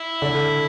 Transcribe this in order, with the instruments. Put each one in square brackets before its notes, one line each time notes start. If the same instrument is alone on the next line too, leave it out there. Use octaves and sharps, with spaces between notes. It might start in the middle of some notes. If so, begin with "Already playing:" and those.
Already playing: [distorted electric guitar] E4
[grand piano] D3